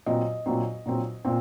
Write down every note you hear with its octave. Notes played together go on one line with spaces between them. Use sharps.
A#2 F#3 C4 D#5
A#2 F#3 C4
A#2 F#3 C4
A#2 C4